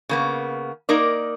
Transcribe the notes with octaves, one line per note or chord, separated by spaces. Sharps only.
C#3 A#3 B3
A#3 D#4 A#4 D5